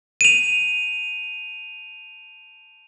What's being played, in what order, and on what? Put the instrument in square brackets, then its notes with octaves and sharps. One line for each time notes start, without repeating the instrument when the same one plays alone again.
[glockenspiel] D#7 F7